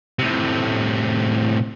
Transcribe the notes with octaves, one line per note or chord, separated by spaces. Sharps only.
A2 C3